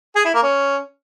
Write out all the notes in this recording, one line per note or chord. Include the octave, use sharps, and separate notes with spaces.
G#4
E4
A#3
C#4